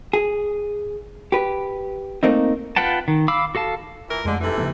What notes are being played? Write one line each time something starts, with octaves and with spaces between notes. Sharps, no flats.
G#4
G4 B4
A3 A#3 C4 D#4
F4 B4 F#5 G5 A5
D#3
F5 B5 D6 E6
F#4 A4 F5 A5
A#2 E3 A#4
F2 D3 G#3 A3
G#2 C3 E3 A4
C#3 F3 A#3